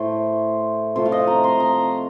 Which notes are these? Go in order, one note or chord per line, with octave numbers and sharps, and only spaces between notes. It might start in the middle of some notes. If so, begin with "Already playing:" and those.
Already playing: A2 A3 C5
C3 F3 A3 C5
F5
D#5
A#5
C6
A#5